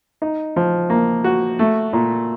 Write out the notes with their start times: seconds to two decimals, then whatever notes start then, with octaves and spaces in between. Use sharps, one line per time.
0.22 D#4
0.56 F3
0.90 A#3
1.24 F#4
1.59 A3
1.93 A#2